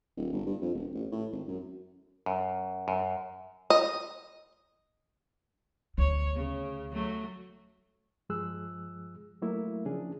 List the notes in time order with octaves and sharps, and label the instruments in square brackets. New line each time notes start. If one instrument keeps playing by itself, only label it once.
[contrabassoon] D#1
G1
G2
F2
E1
A1
A2
G#1
F#2
[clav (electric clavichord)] F#2
F#2
[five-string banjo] D#5
[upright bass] D2 [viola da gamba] C#5
[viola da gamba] C#3
F#3 A3
[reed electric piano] G2 F3 G#3 G#4 E6 F#6
F#3 A3 A#3 E4 A#4 E5
C#3 F3 C#4 D4 G#4